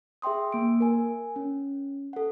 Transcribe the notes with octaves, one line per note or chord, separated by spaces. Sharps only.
G#4 E5 G5 C6 D#6
A#3 D7
A#4 G#5
C#4
A4 F#5